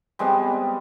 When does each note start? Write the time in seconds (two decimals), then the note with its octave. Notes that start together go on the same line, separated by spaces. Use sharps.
0.19 G3 G#3 B3 C4